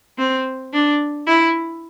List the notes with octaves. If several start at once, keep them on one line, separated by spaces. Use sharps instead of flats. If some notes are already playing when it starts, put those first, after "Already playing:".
C4
D4
E4